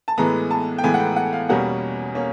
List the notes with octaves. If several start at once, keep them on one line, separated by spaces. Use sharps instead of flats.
A5
A2 E3 G#3 B3 A#5
A5
G5
A2 E3 G#3 B3 G#5
F#5
G5
F#5
F5
E2 B2 G3 A#3 C#4 F#5
A#3 C#4